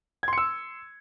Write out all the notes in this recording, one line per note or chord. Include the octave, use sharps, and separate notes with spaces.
C6 E6 G#6 C#7